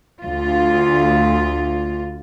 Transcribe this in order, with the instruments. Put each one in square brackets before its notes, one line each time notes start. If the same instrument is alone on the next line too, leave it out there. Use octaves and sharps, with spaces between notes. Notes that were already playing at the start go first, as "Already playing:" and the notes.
[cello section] D2 F4